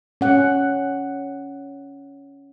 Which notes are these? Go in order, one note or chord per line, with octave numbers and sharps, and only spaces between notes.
C#4 F#5